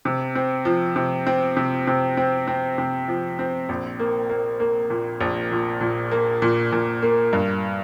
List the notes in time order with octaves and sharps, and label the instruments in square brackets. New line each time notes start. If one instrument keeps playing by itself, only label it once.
[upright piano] C3
C4
F3
C3
C4
C3
C3
C4
C4
C3
F3
C4
A#1
A#3
A#3
A#3
A#2
A#1
A#2
A#2
A#3
A#2
A#2
A#3
G2